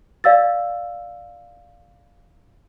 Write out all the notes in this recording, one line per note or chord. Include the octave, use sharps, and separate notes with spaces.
D5 F5 E6 A6